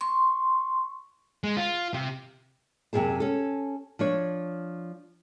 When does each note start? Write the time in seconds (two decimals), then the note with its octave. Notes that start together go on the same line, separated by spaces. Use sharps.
0.01 C6 C#6
1.44 G#3
1.57 F4
1.94 C3
2.93 F#2 C3 D#3 E3 G#4 A5
3.20 C#4 A4
3.99 F3 D4 C#5